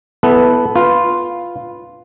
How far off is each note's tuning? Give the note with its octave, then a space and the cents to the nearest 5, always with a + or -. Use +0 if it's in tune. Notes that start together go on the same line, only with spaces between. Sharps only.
B3 +0 E4 +0 A4 -15
F4 +0 B4 +0